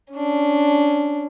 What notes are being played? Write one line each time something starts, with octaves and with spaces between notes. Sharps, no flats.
C#4 D4